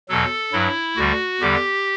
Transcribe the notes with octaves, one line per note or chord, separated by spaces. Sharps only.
E2 B2 F#3 A4
G2 F#3 E4
D2 D3 G3 F#4
E2 D3 G3 G4